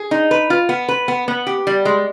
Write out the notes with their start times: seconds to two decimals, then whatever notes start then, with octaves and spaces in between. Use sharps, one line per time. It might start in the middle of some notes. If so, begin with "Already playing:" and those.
Already playing: G#4
0.11 D#4
0.31 B4
0.50 F4
0.69 B3
0.89 B4
1.08 B3
1.28 B3
1.47 G4
1.67 G3
1.85 G#3